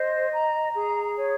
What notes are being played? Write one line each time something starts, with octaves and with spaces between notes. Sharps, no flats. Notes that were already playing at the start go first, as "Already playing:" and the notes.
Already playing: C5 D#5
A#5
G#4
C#5